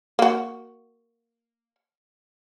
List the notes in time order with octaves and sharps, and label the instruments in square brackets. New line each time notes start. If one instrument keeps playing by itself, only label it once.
[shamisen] A#3 F#4